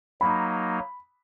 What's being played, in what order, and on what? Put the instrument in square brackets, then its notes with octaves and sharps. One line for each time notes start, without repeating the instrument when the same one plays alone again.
[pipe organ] F#3 A#3 D#4 [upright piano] B5